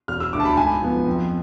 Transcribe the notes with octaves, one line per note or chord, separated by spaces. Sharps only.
E1 F6
E6
D2 D3 D6
A5
B5
G#2 G#5
F3 B3
F2